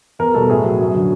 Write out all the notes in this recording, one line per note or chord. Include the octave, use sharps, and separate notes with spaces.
E2 A#4
B2 G3 A4
A2 G#4
F#3
F#2
D3 F#3